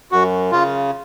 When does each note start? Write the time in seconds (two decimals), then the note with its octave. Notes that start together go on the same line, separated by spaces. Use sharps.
0.12 F#2 F#4
0.52 C#3 F4